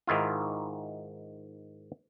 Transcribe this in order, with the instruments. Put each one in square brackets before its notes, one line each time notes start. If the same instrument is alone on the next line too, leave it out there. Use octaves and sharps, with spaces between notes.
[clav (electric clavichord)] G#2 D#3 E4 F4